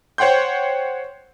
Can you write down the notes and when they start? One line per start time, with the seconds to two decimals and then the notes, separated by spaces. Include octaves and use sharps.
0.18 C5 C#5 F#5 G5 C6 G6